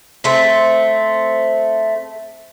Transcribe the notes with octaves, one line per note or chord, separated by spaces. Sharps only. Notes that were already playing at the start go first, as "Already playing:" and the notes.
A3 C4